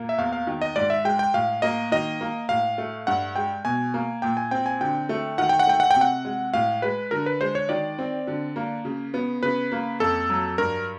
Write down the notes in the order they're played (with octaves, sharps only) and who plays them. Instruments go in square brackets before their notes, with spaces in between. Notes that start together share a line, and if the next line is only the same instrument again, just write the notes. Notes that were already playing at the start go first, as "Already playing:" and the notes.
Already playing: [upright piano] A#2 A#3
[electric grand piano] E5
[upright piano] E2 [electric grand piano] F5
[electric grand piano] F5
[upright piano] D#3
[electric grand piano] D#5
[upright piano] G#2 [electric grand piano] D5
[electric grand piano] E5
[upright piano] G#3 [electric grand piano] G5
[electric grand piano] G5
[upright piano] A2 [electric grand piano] F5
[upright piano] A#3 [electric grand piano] D#5
[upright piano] D#3 [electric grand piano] D#5
[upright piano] A#3
[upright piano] A2 [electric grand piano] F5
[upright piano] A3
[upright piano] G2 [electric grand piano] F#5
[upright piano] G#3 [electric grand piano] G5
[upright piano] B2 [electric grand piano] G#5
[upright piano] A#3
[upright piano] A#2 [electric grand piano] G5
[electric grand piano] G#5
[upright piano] C4 [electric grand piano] G5
[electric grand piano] G#5
[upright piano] D3 [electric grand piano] G5
[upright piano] A3
[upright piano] D#3 [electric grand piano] F#5
[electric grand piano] G5
F#5
[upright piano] A3 [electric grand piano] G5
[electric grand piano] F#5
G5
[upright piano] C3
[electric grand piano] F#5
[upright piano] G#3
[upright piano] A2 [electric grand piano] F5
[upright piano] G#3 [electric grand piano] B4
[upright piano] D3 [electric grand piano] A#4
[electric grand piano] B4
[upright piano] G#3 [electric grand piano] C5
[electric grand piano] C#5
[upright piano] D#3 [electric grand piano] D5
[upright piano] C4
D3
A#3
C#3
B3
[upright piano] C#3 [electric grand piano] B4
[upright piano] A#3
[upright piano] F2 [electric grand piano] A4
[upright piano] F#3
[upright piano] G2 [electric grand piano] A#4